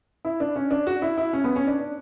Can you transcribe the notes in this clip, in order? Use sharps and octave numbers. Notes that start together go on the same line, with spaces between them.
E4
D4
C#4
D4
F#4
E4
E4
C#4
B3
C#4
D4
D4